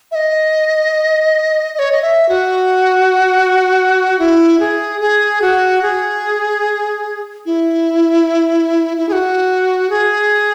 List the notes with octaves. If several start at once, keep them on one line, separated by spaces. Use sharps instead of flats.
E5
D#5
D#5
C#5
D#5
E5
F#4
E4
G#4
G#4
F#4
G#4
E4
E4
G#4
F#4
G#4